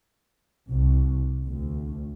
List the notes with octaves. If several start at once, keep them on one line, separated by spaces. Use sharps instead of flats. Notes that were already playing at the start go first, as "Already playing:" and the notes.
C2
D2